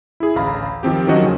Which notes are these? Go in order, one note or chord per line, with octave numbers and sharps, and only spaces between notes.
E4 G#4
A1 D2 F5 A#5 B5
D#3 F3 C4 G4
D#3 F3 F#3 C#4 F#4 D#5
D#2 C#3 C#4